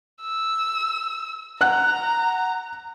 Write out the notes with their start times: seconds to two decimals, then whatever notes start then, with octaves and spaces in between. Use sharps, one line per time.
0.22 E6
1.61 F#5 A#5 F#6